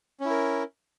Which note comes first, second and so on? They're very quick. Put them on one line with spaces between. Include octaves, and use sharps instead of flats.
C#4 E4 A#4